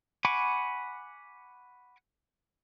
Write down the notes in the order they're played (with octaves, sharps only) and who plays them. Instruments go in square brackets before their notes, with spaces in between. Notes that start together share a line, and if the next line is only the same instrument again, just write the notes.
[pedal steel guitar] F#5 G#5 B5 C#6 D6